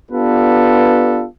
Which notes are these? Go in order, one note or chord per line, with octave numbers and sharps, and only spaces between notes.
B3 D4 F4 G4 A4 B4